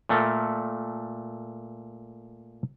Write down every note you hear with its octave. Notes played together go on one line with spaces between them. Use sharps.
A#2 A3 A4 A#4